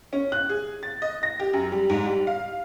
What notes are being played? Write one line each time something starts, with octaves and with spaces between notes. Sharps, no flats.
C#4
F#6
G#4
A6
D#5
A#6
G4
F#2
G3
G#2
G3
F5